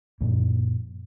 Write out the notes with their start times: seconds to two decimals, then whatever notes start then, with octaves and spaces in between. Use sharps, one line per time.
0.21 F#2 A#2 F3 A#3